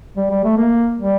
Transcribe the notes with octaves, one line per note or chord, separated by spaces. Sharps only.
G3
G3
A3
A#3
G3